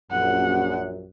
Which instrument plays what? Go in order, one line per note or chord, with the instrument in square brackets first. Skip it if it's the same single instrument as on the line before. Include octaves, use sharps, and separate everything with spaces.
[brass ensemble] A#1 F#2 [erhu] F#5